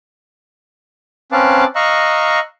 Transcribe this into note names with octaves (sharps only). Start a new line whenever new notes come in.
C4 C#4 B4 F5 A5 D6
D#5 F5 A#5 C#6 E6 F#6